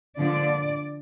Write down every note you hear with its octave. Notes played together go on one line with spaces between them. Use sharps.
D3 F3 A#3 D4 D5